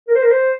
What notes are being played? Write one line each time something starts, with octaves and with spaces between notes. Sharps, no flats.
A#4
C5
A#4
C5